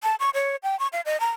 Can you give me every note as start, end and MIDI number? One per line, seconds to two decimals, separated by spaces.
0.03 0.15 81
0.20 0.30 85
0.34 0.56 73
0.63 0.78 79
0.79 0.87 85
0.93 1.01 77
1.05 1.19 75
1.20 1.30 82